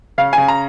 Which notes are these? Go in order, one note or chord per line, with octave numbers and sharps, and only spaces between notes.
C#3 F5
C#3 G#5
A#5